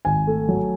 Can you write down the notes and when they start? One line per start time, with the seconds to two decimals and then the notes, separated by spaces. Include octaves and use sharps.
0.05 G#1 G#5
0.27 A3
0.49 F#3